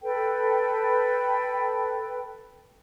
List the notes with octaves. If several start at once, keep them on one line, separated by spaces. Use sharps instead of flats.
A4 B4 G5